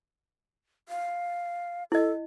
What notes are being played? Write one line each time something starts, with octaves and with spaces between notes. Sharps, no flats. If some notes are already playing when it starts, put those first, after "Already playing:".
F5
E4 A4 D#5